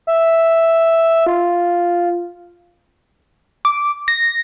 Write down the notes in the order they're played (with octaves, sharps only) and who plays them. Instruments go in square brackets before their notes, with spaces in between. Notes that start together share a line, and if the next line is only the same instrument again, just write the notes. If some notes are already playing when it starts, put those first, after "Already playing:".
[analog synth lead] E5
F4
[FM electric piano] D6
A#6